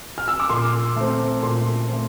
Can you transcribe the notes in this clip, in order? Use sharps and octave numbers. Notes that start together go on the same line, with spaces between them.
F6
E6
D6
A#2 C6
A3 C4
A#2 C6
A3 C4